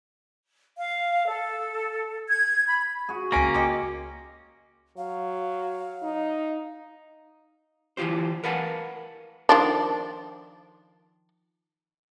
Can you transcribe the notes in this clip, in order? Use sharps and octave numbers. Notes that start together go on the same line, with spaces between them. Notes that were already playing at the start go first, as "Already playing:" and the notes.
F5
A4
G#6
B5
F#4 G#4
C#2 C3 A#3 C#4 G#5 D7
F4 G4 D#5 D6
F#3 F5
D#4
E3 E4 F4 G4 C5
A#4 B4 F5 F#5 G#5 A5
D#3 F3 D4